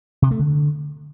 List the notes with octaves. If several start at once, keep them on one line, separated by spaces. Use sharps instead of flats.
C3
A3
D3